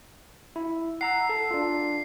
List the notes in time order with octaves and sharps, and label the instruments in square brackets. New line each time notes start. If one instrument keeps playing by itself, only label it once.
[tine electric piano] E4
[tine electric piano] F#5 A#5 E6 [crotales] C7
[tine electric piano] A4
D4 F4